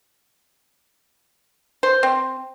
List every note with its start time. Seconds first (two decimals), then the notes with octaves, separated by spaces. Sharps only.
1.83 C5
2.03 C4